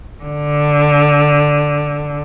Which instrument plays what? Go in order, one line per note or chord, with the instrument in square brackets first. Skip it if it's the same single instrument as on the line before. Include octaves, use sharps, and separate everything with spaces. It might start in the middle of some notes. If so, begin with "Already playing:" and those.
[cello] D3